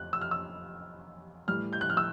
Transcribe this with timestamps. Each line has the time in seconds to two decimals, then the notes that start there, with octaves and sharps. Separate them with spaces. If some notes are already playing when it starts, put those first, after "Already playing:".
Already playing: F2 F#6
0.13 E6
0.21 F6
0.31 E6
1.48 A2 E3 G3 F6
1.73 G6
1.81 F#6
1.90 F6
1.97 E6